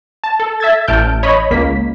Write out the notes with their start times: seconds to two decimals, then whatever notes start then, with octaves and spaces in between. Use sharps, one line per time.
0.24 A5
0.40 A4
0.60 E5 E6 G#6 A6
0.87 A1 A5 F6 G6 D7
1.23 C#5 D#5 B5
1.51 C#2 A#3 B6